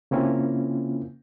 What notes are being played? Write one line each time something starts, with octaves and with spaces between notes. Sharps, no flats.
C#3 A#3 C4 C#4 E4 F4